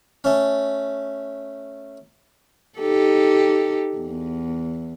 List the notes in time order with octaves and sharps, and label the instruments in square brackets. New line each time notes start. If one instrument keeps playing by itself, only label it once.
[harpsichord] A3 C#4
[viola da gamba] D#4 G4 A4
E2